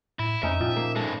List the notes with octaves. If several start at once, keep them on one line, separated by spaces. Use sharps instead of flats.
A2 E4
F2 C#4 D#4 E5
A#2 F3 D#5 G5
A#3
G2 G#3 A4